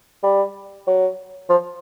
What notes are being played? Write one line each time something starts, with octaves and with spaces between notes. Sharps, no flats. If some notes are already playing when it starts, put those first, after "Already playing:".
G3
F#3
F3